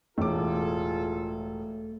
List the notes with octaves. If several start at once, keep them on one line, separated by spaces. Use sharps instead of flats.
E1 A2 A3 F4 G#4 A4 D6